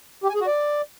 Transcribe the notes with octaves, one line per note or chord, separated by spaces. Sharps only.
G4
G#5
G#4
F#4
D5